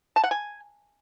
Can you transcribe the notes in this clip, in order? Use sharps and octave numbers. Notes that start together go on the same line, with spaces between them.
A5
F#5
G#5